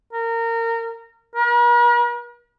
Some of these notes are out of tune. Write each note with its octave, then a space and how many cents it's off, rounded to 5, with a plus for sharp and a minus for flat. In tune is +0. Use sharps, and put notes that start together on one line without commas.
A#4 -25
A#4 +45